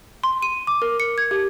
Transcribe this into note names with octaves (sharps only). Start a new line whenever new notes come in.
C6
D#7
D6
A#4
C#7
G#6
G4